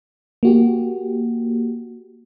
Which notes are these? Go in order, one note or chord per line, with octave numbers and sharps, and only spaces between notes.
A#3 F#4 G4